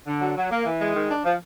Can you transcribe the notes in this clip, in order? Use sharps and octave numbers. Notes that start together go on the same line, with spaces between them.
D3
F#3
F#3
A#3
E3
G#3
D#3
D4
F3